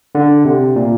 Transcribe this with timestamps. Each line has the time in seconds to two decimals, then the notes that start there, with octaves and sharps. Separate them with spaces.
0.15 D3
0.45 C3
0.76 A#2